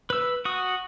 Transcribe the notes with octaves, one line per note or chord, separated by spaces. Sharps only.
B4 E6
F#4 D#6